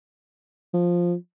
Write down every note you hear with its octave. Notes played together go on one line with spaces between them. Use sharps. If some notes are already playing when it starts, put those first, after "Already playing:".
F3